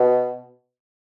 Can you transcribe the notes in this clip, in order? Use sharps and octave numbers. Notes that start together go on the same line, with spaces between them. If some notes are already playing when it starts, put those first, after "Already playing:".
Already playing: B2